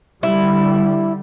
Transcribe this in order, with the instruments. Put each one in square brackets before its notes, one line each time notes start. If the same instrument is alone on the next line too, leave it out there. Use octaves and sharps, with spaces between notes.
[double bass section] D3 G3 [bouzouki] E4